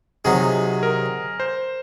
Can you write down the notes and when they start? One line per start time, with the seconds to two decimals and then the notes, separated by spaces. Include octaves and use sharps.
0.25 C3 D#3 F#3 C4 D#4 G#4
0.83 A#4
1.40 C5